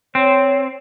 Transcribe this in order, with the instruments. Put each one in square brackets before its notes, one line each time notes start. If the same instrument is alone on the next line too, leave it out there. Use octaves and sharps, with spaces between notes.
[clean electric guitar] C4 [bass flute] C#5